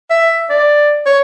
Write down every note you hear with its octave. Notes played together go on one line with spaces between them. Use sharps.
E5
D5
C#5